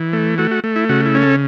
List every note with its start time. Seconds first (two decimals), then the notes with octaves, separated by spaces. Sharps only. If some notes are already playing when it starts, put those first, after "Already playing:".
Already playing: E3
0.13 A3
0.38 A3 F#4
0.51 F#4
0.64 A3
0.76 E4
0.89 C#3 F#4
1.06 E4
1.15 C#4
1.23 A4